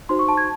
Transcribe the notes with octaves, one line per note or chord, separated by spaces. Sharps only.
D#4 F#4 C5 C6
C#6
A5
G#6